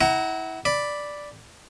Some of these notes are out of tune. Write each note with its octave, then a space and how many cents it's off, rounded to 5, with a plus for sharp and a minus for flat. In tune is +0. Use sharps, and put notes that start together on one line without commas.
E4 -25 F#5 +20 A#5 +0
D5 +0 B5 +0